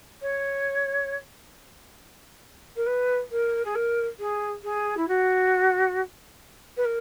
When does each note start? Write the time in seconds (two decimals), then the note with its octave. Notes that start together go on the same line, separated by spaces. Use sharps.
0.22 C#5
2.76 A#4
2.86 B4
3.31 A#4
3.65 G#4
3.75 A#4
4.19 G#4
4.64 G#4
4.97 E4
5.08 F#4
6.77 B4
6.85 A#4